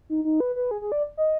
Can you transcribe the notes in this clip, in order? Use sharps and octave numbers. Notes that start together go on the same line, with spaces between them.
D#4
D#4
B4
B4
G#4
G#4
D5
D#5